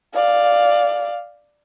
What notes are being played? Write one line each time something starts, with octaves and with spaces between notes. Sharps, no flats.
D5 F5